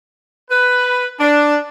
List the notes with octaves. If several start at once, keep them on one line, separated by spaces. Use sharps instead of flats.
B4
D4